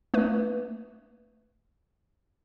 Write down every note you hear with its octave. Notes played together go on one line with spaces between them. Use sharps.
A3 A#3 B4